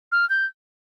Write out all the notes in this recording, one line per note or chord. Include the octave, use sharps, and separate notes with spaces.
F6
G6